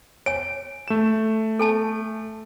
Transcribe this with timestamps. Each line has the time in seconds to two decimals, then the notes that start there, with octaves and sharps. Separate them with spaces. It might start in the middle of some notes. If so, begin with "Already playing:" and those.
0.26 C#5 G#5 D7
0.88 A3 E7
1.59 A4 G#5 A5